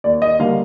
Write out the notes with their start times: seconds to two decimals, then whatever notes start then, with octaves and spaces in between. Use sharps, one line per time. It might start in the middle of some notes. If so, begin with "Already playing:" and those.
0.04 D#2 D5
0.22 D#5
0.39 D3 G3 A#3 F5